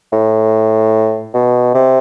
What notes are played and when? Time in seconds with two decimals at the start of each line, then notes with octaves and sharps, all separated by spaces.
0.12 A2
1.34 B2
1.74 C3